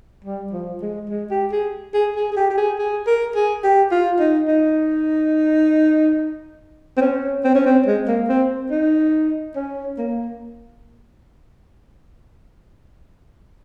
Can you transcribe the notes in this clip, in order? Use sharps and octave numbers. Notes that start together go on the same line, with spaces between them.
G3
F3
G#3
G#3
G4
G#4
G#4
G#4
G#4
G4
G4
G#4
G#4
A#4
G#4
G4
F4
D#4
D#4
C4
C#4
C4
C#4
C4
G#3
A#3
C4
D#4
C#4
A#3